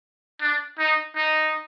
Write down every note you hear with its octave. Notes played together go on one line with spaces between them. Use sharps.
D4
D#4
D#4